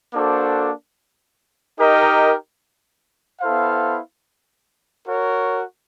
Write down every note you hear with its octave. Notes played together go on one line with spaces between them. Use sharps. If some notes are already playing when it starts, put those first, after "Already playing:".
A#3 D4 F#4 A4 C5
D#4 G4 A#4 D#5
B3 E4 A4 C5 F5
F#4 A#4 C#5